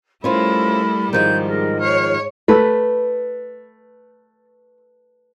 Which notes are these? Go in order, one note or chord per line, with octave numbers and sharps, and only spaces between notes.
G3 A3 C#4 E4 F4 A#4 C5 B5
G#2 D#3 F3 G#3 G6
A#4
C5 C#5 F6
A3 B4